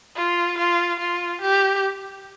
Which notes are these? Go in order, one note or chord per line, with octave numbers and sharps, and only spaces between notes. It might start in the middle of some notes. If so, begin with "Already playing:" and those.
F4
F4
F4
G4